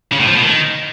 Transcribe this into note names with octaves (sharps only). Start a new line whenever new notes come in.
C#3
A2
F3
B2
D#3